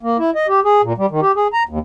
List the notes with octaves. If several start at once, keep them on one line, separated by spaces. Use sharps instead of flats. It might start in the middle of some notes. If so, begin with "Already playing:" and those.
A#3
E4
D#5
G4
G#4
A#2
G3
D#3
G4
G#4
A#5
D#2